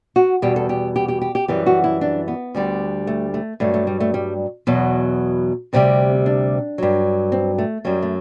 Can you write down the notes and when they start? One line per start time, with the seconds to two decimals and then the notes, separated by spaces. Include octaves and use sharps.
0.16 F#4
0.42 E2 B2 G3 G4
0.56 A4
0.69 G4
0.96 G4
1.08 G4
1.21 G4
1.35 G4
1.48 F#2 E3 G3 G4
1.66 F#4
1.84 E4
2.01 D4
2.28 B3
2.55 D2 D3 G3
3.07 A3
3.34 A3
3.60 G2 F#3 A3
3.74 A3
3.87 G3
4.00 A3
4.14 G3
4.67 E2 B2 F#3
5.73 D2 C3 G3 C4
6.26 D4
6.78 G2 F#3
7.32 C4
7.58 A3
7.85 F#2 F#3 G3
8.02 A3